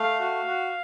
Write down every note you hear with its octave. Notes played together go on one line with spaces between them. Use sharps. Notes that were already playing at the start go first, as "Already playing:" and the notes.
Already playing: A3 F5
F#4
F#4